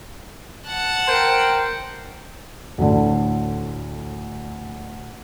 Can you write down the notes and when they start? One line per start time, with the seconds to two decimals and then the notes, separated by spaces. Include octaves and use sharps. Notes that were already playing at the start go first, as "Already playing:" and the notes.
0.67 F#5 A5
1.08 A#4 C5 G5
2.78 D2 A2 D3